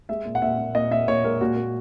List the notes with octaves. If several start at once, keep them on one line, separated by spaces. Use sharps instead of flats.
G#3 E5
A#2
F#5
A#2 E5
A#2
A#2 D#5
A#2 E5
A#2 C#5
G#3 A#4
A#2 F#4
A#2